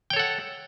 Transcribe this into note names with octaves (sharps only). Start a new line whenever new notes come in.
A4 C#5 F#5 G5